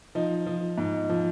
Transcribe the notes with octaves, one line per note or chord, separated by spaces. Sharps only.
F3 D#4
F3
G#2
F3